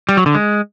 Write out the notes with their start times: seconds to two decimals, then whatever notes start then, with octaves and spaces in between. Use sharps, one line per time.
0.09 G3
0.17 F#3
0.26 D3
0.35 G#3